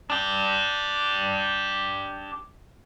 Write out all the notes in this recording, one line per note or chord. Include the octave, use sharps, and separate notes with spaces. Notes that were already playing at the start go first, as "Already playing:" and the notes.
D4 G4